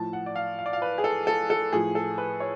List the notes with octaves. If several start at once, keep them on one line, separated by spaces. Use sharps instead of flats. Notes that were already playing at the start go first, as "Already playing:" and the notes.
Already playing: A2 F3 A5
F#5
D5
F5
F5
D5
F5
B4
G#4
A4
A4
A4
A2 F3 G#4
A4
B4
C#5